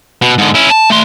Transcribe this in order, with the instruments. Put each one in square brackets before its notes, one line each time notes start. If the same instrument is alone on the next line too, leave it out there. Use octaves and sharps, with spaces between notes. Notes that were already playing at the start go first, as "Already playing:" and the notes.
[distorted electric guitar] B2
G#2 D3
C#4 E4
A5
A3 C6